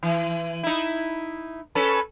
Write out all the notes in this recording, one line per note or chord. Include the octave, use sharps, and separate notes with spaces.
E3
D#4 E4
C#4 A4 B4